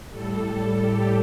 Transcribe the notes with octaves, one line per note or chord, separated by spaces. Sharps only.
A2 G3 A4
G4